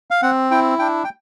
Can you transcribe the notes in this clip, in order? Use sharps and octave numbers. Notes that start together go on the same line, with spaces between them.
F5
C4 F#5
E4 G5
D4 G5
G5